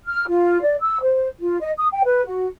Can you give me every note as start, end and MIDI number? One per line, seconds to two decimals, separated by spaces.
0.06 0.24 89
0.28 0.61 65
0.62 0.76 74
0.81 0.99 88
1.02 1.27 72
1.39 1.57 65
1.60 1.71 75
1.78 1.87 87
1.92 2.02 79
2.05 2.24 71
2.26 2.45 66